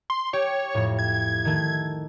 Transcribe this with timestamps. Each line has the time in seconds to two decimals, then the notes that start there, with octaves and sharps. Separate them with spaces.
0.10 C6
0.33 G4 C#5
0.74 F2 A2
0.99 G#6
1.45 D#3 A3